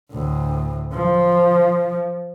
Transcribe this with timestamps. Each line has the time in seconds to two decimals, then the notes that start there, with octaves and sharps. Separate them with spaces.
0.11 D2 A2
0.94 F3